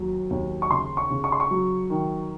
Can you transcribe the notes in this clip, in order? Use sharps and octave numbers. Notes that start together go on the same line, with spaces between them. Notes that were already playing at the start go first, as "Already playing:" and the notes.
Already playing: D#2 F#3
D#2
C#6
C#3 C6
C#6
C#3
C#6
C6
C#6
F#3
D#3